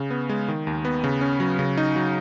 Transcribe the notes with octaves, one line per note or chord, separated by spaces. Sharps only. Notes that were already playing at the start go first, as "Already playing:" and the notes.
Already playing: C#3
B3
G#3
D#3
D#2
B3
C#3
C#4
F#3
C#3
D#4
F#3